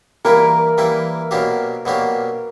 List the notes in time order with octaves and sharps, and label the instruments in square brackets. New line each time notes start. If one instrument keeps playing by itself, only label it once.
[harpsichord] E3 G3 A#3 E4 B4 [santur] A#4
[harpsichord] E3 G3 A#3 E4 B4
B2 F#3 A#3 D4 G4
B2 F#3 A#3 D4 G4